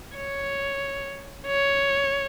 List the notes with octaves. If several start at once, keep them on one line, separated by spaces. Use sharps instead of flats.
C#5
C#5